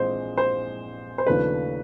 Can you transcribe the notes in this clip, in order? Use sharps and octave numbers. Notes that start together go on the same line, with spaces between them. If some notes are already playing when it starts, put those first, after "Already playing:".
Already playing: A#1 E3 G#3 C4 C5
C5
C5
D#2 C#3 F3 A3 D4 B4